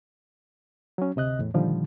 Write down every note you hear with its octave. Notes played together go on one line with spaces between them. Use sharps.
F#3 C#4
D2 C3 D#5 F#6
E2 A2
A#2 D3 D#3 F3 G3